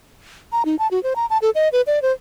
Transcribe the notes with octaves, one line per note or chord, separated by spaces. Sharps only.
A#5
D#4
A5
F#4
C5
A#5
A5
A4
D#5
B4
D5
C5